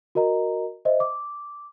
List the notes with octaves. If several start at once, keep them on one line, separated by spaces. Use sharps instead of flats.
F#4 A#4 D#5 A#5
C5 D#5 E5
D6